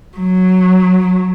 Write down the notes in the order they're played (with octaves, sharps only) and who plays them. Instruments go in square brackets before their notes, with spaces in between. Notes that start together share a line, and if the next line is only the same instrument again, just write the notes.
[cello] F#3